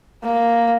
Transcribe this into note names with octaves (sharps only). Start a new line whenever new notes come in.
A#3